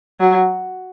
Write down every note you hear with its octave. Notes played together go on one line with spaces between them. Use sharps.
F#3